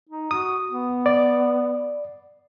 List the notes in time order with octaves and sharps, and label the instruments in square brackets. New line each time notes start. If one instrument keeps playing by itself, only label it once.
[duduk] D#4
[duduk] F#4 [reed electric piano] D#6
[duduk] B3
[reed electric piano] D5